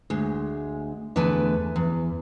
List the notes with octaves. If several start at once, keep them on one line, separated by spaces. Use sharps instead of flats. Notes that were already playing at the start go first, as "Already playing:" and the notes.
D2 G#3
E2 D3 A3 B4 G#5 A5
E2